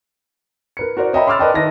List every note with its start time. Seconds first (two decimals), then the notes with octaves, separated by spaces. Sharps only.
0.77 A#4 B4 C#7
0.97 F#4 A#4 C5 D5
1.13 C#5 D#5 E5 G5 A#5 B5
1.27 B5 C6 D6 E6 F6 A6
1.39 A#4 B4 D5 D#5 G5 A5
1.54 D#3 E4 B4 D#5 A5 A#6